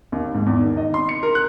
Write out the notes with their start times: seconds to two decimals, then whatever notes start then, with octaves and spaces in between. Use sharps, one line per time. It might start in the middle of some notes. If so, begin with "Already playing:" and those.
0.12 D#2
0.34 G#2
0.46 E2
0.61 D#3
0.77 D#5
0.94 C6
1.09 C#7
1.23 A#4
1.35 F#6